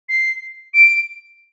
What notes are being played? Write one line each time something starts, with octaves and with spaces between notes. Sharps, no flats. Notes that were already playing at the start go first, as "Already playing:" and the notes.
C7
D7